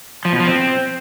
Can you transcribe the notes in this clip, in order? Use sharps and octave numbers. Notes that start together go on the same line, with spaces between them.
F3
B2
F3
C4